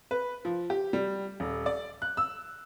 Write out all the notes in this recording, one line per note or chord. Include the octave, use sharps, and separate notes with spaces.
B4
F3
G4
G3
D#1
D5
F#6
E6